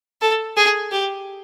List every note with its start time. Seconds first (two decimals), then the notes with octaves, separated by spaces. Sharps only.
0.21 A4
0.57 G#4
0.92 G4